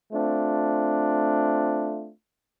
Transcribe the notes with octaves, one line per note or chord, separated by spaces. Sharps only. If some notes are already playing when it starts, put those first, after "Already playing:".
A3 C4 D4 F4